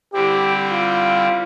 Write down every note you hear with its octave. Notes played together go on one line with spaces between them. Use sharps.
D3 G3 C4 E4 G4
F4